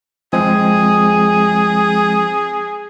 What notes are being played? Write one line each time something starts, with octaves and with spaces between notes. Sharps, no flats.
F3 G#3 C4 G#4